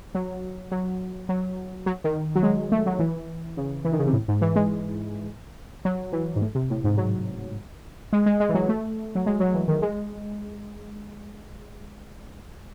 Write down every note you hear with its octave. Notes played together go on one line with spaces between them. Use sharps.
F#3
F#3
F#3
F#3
D#3
F#3
G#3
A3
F#3
E3
C#3
E3
D#3
C#3
C3
A2
G#2
E3
G#3
F#3
E3
G#2
A2
C3
A2
G#2
F#3
G#3
G#3
G#3
E3
F#3
A3
F#3
G#3
F#3
E3
D#3
G#3